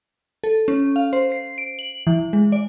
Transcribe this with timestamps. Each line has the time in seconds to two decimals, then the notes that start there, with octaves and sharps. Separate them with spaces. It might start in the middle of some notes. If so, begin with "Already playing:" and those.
0.44 A4
0.68 C#4
0.96 F5
1.13 C5
1.32 C7
1.58 D7
1.79 F#7
2.07 E3
2.33 G#3
2.52 D5